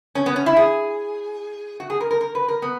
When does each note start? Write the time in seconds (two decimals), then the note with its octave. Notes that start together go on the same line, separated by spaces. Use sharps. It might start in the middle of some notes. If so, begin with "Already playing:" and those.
0.15 C#4
0.26 B3
0.36 C#4
0.46 E4
0.57 G#4
1.80 F#4
1.90 G#4
2.01 A#4
2.11 A#4
2.21 A#4
2.35 B4
2.48 A#4
2.62 B3